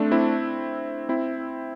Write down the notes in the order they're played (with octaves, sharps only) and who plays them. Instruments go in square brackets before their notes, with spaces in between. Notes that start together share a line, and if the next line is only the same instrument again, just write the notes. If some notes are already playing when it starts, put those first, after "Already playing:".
Already playing: [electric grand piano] A3 C4 D4
C4 E4
C4 E4